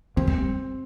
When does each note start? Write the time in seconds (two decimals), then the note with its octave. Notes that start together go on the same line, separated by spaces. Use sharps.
0.16 A#3 C4
0.27 G3